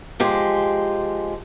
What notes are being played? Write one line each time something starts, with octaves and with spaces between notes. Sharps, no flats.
F3 G#3 G4